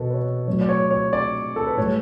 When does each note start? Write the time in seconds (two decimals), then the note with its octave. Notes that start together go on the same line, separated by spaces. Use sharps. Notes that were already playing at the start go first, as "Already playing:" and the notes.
Already playing: B2 A4 B4
0.10 B4
0.14 C#5
0.48 A2 F#3 C#5
0.61 D5
0.69 C#5
0.91 C#5
1.13 D5
1.56 A4
1.66 B4
1.77 A2 C#5
1.82 G3